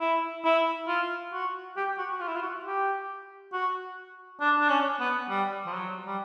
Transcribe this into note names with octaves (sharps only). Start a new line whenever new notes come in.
E4
E4
F4
F#4
G4
F#4
F#4
F4
E4
F4
F#4
G4
F#4
D4
D4
C#4
B3
G3
F3
F#3
G3